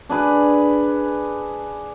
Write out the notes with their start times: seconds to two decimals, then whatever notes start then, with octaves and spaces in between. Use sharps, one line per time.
0.09 D4 G#4 B4